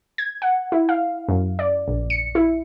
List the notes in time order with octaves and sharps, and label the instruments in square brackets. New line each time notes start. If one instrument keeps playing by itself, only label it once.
[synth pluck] G#6
F#5
E4
F5
F#2
D5
A#1
C#7
E4